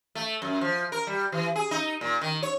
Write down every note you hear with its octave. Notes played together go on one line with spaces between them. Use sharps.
A3
F#2
F3
A#4
G3
E3
G#4
D#4
A#2
D#3
C#5